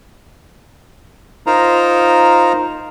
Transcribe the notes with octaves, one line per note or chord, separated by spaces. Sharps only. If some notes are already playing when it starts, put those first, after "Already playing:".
D#4 F4 A#4 C5 A#5